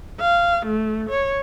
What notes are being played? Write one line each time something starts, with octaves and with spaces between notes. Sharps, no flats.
F5
A3
C#5